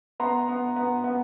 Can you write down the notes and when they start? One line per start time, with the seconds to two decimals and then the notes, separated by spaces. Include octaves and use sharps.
0.20 B3 A#5 C6
0.48 B3
0.76 B3
1.04 B3